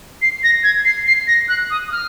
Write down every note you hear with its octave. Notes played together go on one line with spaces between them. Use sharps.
C7
A#6
G#6
C7
C7
A#6
F#6
D#6
D#6
F6